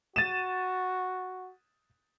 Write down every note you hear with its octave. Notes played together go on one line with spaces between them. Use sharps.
F#4 A6 D#7 E7